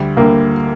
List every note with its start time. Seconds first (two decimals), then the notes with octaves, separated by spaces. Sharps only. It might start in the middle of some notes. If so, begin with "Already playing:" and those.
Already playing: D2 D3 G3
0.17 D2 D3 G3 A#3